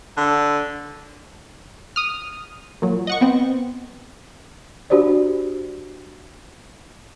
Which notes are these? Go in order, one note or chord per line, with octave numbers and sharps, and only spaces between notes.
D3
D#6 F6
A#2 F#3
D#5 F#5 C#6
B3 C4
D4 F#4 G4 C5 D5